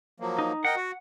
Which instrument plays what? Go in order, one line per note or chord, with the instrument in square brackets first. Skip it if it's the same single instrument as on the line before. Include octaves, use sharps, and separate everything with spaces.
[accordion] F3 F#3 A#3
[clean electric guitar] D#4
[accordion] A#4 D#5 G5 [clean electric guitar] F#5
[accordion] F#4